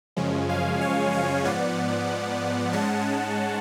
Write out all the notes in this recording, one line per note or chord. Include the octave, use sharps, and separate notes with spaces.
F#2 C#3 F3 G#3 C#4
F5 G#5
C#5 F5
C#5 F5
G#2 F3 B3 D5 F#5
G#2 G#3 C#4 F#5 A5